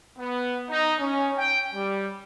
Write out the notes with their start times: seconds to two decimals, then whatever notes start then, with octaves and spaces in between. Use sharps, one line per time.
0.18 B3
0.69 D#4
0.99 C#4
1.37 G5
1.73 G3